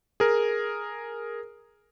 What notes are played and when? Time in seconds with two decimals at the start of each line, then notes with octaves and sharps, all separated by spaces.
0.20 G#4 A#4